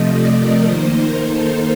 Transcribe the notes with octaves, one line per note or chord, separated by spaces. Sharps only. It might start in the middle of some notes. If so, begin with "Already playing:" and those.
Already playing: C3 F3 A3 D#5
D5
A#4
D#3 A#3 D#4 C5
A#4
A4